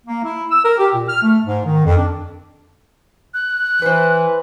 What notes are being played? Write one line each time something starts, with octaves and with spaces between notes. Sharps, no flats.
A#3
E4
E6
A#4
G4
A#2
F6
A3
G#2
D#3
F2
D4
F#6
E3 B4 C5